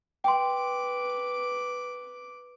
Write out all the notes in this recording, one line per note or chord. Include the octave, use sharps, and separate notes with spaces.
B4 G5 C6 D6